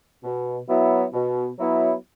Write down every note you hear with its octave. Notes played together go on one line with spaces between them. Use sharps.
B2
F#3 B3 E4
B2
F#3 B3 E4